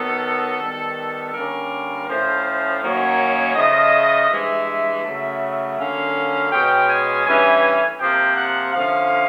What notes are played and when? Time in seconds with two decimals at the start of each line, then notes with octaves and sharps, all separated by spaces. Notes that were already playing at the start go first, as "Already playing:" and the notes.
Already playing: D#3 F#3 B3 A4
0.60 D#3 G3 B3
1.34 D3 G3 A#3 C#4 A#4
2.08 A2 F3 A3 C#4 C5
2.45 C5
2.82 F#2 D#3 F#3 A#3 C#4 C#5
3.55 C#3 F3 A3 D#5
4.29 G2 E3 G#3 E5
5.04 C#3 F#3 A3
5.77 D3 F#3 A#3 C#4 F5
6.51 B2 G#3 C#4 G5
6.89 G#5
7.25 G2 E3 A3 C#4 G#5
7.99 C3 F3 A#3 G5
8.36 F#5
8.74 D3 F3 A3 C#4 F5